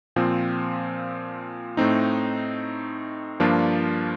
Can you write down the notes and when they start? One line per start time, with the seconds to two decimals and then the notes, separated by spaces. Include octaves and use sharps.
0.16 A#2 F3 C4
1.77 A2 A3 C4 D#4
3.40 G2 F3 A#3 D4 F4